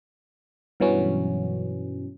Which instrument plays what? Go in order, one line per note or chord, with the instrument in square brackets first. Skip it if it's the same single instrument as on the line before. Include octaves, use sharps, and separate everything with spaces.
[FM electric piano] G2 B2 E3 F#3 B3 C#4